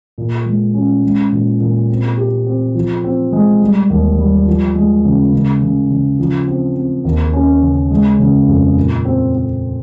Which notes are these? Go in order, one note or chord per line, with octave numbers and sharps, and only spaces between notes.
A#2
G#3
C#4
G#3
A#2
A#2
C4
G4
C4
F3
C4
G#3
G3
D#2
G3
F3
G#3
C#3
C#3
C#3
C#3
F3
C4
C4
D#2
C#4
C#3
G#3
C#3
F2
A#2
C4
C4